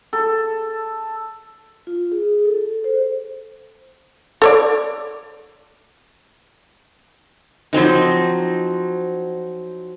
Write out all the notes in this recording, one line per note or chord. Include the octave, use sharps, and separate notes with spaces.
A4
F4
G#4
A4
C5
A4 C#5 D5
F3 F#3 C4 D#4